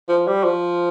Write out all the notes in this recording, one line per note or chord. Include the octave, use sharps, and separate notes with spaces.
F3
G3
F3